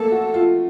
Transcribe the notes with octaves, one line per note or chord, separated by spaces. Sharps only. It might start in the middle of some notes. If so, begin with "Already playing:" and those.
Already playing: A3 A#3 A4
F#4
F4